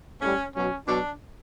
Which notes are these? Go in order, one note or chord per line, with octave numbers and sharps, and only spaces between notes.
A2 G3 C#4
B2 F#3 C#4
B2 F#3 D4